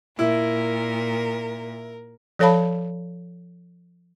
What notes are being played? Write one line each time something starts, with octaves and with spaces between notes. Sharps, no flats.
A#2 E4 A#4
F3 A4 C#5 F5 A5 B5